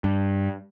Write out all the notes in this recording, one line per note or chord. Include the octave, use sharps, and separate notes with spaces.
G2